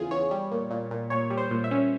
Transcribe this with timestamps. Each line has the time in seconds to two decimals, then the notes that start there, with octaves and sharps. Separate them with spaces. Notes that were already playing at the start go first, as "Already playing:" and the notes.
Already playing: E2 C#3 F4 G#4
0.11 E2 C#5
0.31 G3
0.51 A#2
0.71 A#2
0.91 A#2
1.10 A#2 C#5
1.30 G3
1.38 C5
1.51 A#2
1.64 E5
1.71 C#4